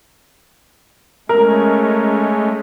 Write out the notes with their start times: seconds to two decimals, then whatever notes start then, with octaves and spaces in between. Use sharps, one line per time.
1.29 G#3 A3 C#4 A#4